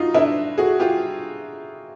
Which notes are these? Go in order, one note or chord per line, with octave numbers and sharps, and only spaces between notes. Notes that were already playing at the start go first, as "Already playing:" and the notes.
Already playing: D#4 F4 F#4
D4 E4
F#4 G#4
F4 G4